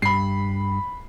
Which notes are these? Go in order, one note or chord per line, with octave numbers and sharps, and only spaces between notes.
G2 B5 C7